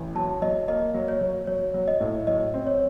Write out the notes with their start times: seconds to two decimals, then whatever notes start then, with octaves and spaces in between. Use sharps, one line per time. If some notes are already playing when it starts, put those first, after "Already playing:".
Already playing: A1
0.15 F#3 A5
0.42 F#3 D#5
0.68 A#3 D#5
0.94 F#3
1.08 C#5
1.21 F#3
1.47 F#3 C#5
1.74 F#3
1.88 D#5
2.01 A2
2.27 F#3 D#5
2.54 C4
2.67 C#5